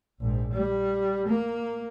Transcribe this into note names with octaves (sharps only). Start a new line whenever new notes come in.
A#1 G#2
G3
A#3